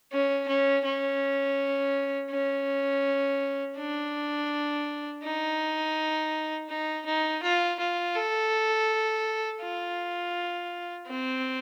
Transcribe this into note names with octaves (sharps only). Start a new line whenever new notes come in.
C#4
C#4
C#4
C#4
D4
D#4
D#4
D#4
F4
F4
A4
F4
C4